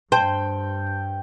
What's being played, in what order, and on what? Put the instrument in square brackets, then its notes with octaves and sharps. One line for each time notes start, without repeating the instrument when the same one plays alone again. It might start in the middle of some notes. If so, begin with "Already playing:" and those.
[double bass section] G2 [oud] C5 [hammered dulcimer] G5 [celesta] A5